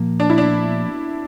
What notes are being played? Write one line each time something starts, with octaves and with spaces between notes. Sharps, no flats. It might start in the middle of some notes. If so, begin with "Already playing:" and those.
Already playing: A#2 F3 A#3
D4
E4
D4